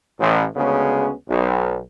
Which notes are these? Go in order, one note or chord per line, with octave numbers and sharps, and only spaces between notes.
A1
D2 C#3 G#3 B3 C#4
B1